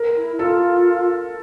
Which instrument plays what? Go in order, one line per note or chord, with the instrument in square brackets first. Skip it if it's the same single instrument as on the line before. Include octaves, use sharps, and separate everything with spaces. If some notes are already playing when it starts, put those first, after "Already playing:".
Already playing: [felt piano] A#4
[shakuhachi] E4
[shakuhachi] F4 [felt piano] A4